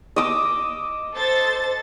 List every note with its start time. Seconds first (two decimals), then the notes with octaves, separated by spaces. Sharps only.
0.16 D#5 D6 E6
1.14 A4 C5 A6